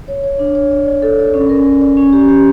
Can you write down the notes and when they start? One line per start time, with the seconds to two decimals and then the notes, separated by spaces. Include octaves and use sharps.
0.08 C#5
0.24 C#5
0.39 D4
0.55 C#5
0.71 D5
0.86 D5
1.02 A4
1.19 D5
1.34 C#4
1.49 A#4
1.66 A#4
1.82 D5
1.97 C#4
2.13 G4
2.28 G4